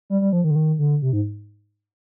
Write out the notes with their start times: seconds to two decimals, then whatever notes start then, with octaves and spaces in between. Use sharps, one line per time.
0.10 G3
0.21 G3
0.33 F3
0.44 D#3
0.51 D3
0.56 D#3
0.79 D3
1.02 C3
1.13 G#2